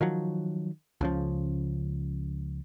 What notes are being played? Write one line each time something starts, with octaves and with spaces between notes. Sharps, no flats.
D#3 F3 F#3
C#2 C#3 F3